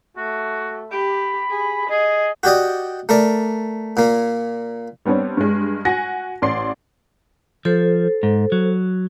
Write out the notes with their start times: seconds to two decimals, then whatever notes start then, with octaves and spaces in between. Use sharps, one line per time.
0.17 A3 F#4
0.92 G4 B5
1.50 G#4
1.90 G#4 D#5
2.43 F#4 G4 D5 D#5
3.09 A3 A#4 D5
3.97 A#2 A#3
5.05 G3 B3 C4 D4 C#5
5.37 G2 G#3
5.85 F#4 F#5 G#5 A#6
6.42 A1 D5 C6 C7
7.65 F3 A4 C5
8.23 G#2
8.52 F#3